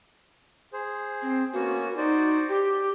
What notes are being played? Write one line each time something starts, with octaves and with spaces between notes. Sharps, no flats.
G#4 C5
C4
A#3 B3 C#4 F#4
D#4 F#4 C5 D5
G4 G5